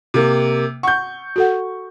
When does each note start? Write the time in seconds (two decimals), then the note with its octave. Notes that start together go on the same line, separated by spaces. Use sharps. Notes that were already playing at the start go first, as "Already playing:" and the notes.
0.14 C3 A#3
0.83 F#5 C#6 G6
1.36 F#4 A4 F#5